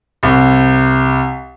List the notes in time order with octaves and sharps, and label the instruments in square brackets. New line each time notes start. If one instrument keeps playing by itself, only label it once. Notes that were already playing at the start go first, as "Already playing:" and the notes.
[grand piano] C2